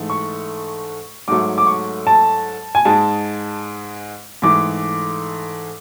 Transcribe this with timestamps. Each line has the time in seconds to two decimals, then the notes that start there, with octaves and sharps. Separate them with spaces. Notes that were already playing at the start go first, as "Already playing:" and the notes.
Already playing: G#2 E3 A3
0.10 C#6
1.28 G#2 F#3 A3 D6
1.58 D6
1.67 C#6
2.07 A5
2.75 G#5
2.85 G#2 G#3 A5
4.42 G#2 E3 A3 D6